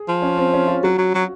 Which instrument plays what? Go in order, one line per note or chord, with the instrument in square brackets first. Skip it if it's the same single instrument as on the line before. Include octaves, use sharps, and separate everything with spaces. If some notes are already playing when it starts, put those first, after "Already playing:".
Already playing: [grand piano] G#4
[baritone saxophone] F3
[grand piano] C#4
C4
C#4
F4
[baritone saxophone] F#3 [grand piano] F#4
[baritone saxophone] F#3
F#3